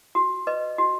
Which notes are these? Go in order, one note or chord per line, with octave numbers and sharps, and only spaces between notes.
F#4
B4 D#5
F#4